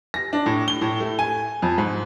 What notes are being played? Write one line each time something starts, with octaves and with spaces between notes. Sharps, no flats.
A#6
D4
A2
G7
A2
A3
G#5
F2
G#2